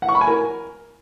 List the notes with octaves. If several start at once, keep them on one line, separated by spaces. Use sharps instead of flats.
F#5
C#6
B5
G#5
A#4